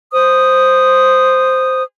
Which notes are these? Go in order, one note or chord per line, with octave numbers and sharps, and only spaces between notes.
C5 D#6